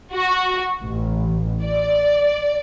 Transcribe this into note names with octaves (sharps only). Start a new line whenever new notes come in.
F#4
A1
D5